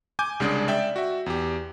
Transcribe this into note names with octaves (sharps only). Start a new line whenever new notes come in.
G#5 D6 G6
C2 C#3 G#3 D4 G#4 D5
D5 E5 G5
F#4 E5
E2 G4